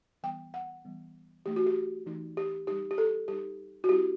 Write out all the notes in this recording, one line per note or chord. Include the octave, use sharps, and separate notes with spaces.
E3 G3 B3 G5
F#5
E3 G3 B3
E3 A3 D#4 G4
F#4
G4
E3 A3 D#4
G4
G3 D#4 G4
G4
A4
G3 D#4 G4
F#4
G3 C4 E4 G4